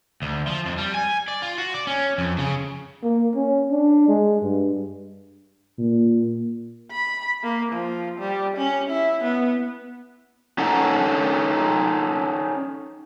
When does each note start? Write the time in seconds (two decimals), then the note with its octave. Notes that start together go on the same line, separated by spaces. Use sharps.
0.22 D2
0.47 F3
0.65 F2
0.78 G3
0.94 G#5
1.28 D5
1.42 F4
1.58 F#4
1.74 D5
1.87 C#4
2.18 F2
2.38 C#3
3.03 A#3
3.35 C#4
3.71 D4
4.08 G#3
4.42 G2
5.79 A#2
6.91 B5
7.43 A#3
7.72 F3
8.19 G3
8.57 C#4
8.90 E4
9.24 B3
10.58 C#4 D#4 A4 F#5 A#5